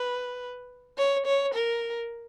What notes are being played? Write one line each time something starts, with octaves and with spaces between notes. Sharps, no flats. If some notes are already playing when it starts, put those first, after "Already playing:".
Already playing: B4
C#5
C#5
A#4